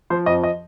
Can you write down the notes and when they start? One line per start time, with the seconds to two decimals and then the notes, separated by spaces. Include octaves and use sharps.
0.10 F3 C5
0.26 F2 D#5
0.44 D#5